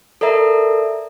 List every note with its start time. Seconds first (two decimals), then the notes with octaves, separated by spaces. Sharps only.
0.21 A4 A#4 D5 E5 A#5